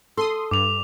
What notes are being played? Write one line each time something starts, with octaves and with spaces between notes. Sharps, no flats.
A4 C6 D#6
G2 D6 F7